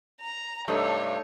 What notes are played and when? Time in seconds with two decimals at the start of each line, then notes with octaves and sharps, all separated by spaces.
0.21 A#5
0.68 G2 C3 A3 D#4 A4 C#5